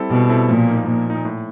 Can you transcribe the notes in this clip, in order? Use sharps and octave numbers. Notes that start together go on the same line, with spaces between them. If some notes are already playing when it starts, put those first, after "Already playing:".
Already playing: G3 C4 E4 A4
B2 G3
C4 E4 A4
A#2 F3
A#3 D#4
A#2 F3
A#3 D#4
A2